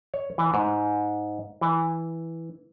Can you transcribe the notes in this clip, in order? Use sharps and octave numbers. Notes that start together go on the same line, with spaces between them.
C#5
E3
G#2
E3